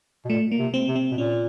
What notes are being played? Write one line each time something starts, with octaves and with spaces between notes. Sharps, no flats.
B2
A#2 A3
A#3
C3
C4
C3
C4
B2
A#2 C#4